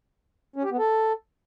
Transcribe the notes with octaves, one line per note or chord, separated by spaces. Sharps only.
C#4
G4
B3
A4